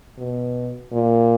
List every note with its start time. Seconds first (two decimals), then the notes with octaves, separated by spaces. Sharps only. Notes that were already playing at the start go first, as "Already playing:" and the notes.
0.19 B2
0.92 A#2